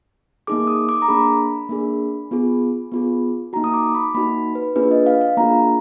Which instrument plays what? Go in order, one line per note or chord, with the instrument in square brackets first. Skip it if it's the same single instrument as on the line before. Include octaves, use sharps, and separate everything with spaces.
[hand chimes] A#3 D#4 G#4 D6
D#6
D6
A#5
A#3 D4 G#4 B5
A#3 D4 G#4
B3 F4 G#4
B3 F4 G#4
A#3 D#4 F#4 A#5
D#6
D6
B5
A#3 D#4 F#4 B5
B4
A#3 D4 F4 G#4 B4
D#5
F5
F5
A#3 D4 F4 G#4 A#5